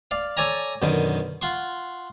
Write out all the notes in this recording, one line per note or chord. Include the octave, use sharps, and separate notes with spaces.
D5 F5
A4 C#5 D5 G#5 A#5
F#2 B2 D3 D#3
F4 F#5 C6 C#6